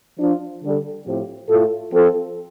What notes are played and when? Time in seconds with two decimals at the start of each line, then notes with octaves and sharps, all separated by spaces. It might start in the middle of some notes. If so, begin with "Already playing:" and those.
0.18 F3 D4 F4
0.62 D3 G3 D4 A4
1.06 A2 F3 C4 G4
1.49 A2 A3 F4 A4
1.93 F3 C4 F4 A4